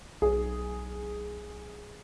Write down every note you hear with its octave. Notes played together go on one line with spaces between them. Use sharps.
B1 G#4